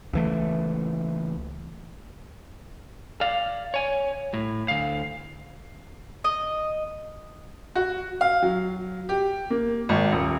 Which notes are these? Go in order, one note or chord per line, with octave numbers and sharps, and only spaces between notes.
C#2 E3 A3
D5 F5
C#5 G#5
A2
D2 F5
D#5
F#4
F5
F#3
G4
A#3
G#1
D#1